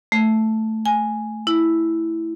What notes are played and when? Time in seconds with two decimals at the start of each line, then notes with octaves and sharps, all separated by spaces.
0.12 A3
0.86 G#5
1.47 E4